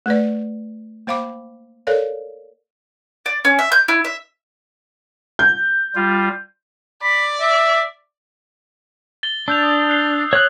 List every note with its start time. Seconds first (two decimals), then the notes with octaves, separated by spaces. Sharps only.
0.06 A3 B4 D5
1.07 A#3 C5 F5 B5 D6
1.87 A4 A#4 C#5 D5 F5
3.26 D5
3.45 C#4
3.59 E5
3.72 G6
3.88 E4
4.04 E5
5.39 G6
5.95 G3 F4
7.03 D5 B5
7.40 E5
9.23 A6 G7
9.48 D4 E6 G6 F7
9.63 D#6
9.90 F#6 C7 G7
10.33 C#5 F#6 F#7